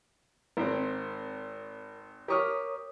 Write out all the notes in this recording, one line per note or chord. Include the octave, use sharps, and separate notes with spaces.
G#1 C4 A#4
G4 A#4 C#5 C#6 D#6 F6